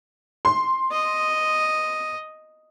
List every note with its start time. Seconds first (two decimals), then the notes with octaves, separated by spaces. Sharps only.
0.45 C6
0.92 D#5